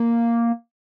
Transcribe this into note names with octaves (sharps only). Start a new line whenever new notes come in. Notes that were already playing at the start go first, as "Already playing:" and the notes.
Already playing: A#3